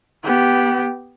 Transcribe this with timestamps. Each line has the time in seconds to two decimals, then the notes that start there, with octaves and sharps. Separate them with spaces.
0.24 B3 G4